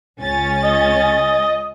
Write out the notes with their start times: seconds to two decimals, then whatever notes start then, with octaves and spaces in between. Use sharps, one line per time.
0.20 C#2 C#4 A6
0.64 D#5